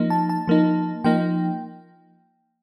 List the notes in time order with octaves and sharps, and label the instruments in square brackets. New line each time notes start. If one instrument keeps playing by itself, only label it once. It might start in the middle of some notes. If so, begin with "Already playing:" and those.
Already playing: [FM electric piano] F3 A#3 D#4
A5
A5
F3 A#3 D#4
F3 A#3 D#4 G5